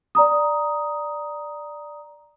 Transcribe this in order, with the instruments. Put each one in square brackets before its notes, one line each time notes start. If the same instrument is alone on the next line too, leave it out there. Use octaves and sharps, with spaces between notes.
[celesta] D5 A#5 D#6